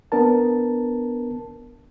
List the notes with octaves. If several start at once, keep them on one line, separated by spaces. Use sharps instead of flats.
B3 D4 A#4 A5